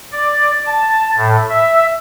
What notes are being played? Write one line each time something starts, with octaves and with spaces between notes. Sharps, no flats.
D5
A5
A2
E5